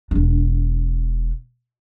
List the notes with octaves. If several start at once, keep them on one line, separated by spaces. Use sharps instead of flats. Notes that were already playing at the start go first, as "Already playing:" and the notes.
E1 D4